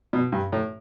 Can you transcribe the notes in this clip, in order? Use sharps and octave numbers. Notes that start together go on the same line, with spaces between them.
B2
G2
A2